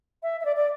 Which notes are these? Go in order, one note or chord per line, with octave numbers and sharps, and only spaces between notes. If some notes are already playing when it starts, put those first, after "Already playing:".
E5
E5
D5
D5